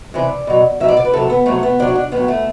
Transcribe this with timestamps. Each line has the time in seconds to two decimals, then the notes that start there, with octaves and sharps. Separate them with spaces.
0.14 C3 E3 D5
0.47 B2 F#3
0.80 F#3 E5
0.84 B2 D5
0.97 D5
1.05 B4
1.13 C3 F#3 A4
1.30 B3
1.46 C3 F#3 A3
1.63 B3
1.79 C3 F#3 D4
1.87 F#4
1.95 D4
2.12 A2 F#3 B3
2.28 A3